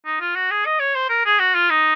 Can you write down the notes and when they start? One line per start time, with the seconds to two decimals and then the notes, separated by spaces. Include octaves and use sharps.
0.06 D#4
0.21 F4
0.35 F#4
0.51 G#4
0.66 D#5
0.80 C#5
0.95 C5
1.10 A#4
1.26 G#4
1.39 F#4
1.55 F4
1.70 D#4